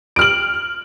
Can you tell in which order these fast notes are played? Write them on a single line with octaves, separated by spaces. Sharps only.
D7 F6 F#7